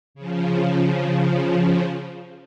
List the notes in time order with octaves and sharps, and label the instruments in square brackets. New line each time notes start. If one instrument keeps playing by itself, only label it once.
[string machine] C#3 F3